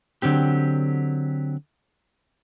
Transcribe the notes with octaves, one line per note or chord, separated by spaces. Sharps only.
D3 F#3 C4 G4